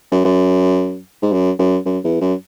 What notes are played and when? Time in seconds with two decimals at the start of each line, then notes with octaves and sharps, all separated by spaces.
0.11 F#2
0.25 F#2
1.22 G#2
1.32 F#2
1.59 F#2
1.86 F#2
2.04 E2
2.21 F#2